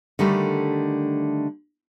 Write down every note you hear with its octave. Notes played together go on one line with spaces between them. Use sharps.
D3 D#3 G3 A3